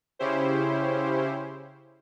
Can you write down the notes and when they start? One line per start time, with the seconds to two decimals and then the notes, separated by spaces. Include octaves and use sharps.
0.19 C#3 C#4 E4 G4 C5